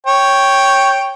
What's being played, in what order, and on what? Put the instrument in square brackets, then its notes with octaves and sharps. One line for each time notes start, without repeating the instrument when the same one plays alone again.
[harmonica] C#5 G5